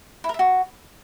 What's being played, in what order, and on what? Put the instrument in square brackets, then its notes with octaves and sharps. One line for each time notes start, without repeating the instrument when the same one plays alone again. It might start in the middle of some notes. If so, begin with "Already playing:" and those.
[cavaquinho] E4
A#4
E5
F#4